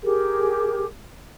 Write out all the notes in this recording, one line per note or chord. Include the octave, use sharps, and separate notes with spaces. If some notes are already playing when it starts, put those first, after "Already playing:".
G4 G#4 A#4